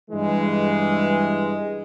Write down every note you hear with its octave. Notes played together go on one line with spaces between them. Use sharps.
G2 E3 G#3